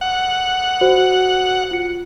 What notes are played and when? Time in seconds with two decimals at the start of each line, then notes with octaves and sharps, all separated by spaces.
0.01 F#5
0.81 F#4 C5
1.71 F4 C#7